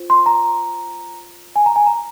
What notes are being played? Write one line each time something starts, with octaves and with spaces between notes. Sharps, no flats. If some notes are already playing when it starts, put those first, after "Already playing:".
Already playing: F4 C5
C6
A#5
G#5
A#5
G#5
A#5